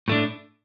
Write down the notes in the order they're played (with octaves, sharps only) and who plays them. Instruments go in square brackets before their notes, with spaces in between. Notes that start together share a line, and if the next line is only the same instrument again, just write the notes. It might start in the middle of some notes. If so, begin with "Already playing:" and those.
[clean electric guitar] A2 A3 D4